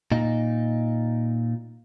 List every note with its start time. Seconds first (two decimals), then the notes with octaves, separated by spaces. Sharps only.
0.12 A#2 D#4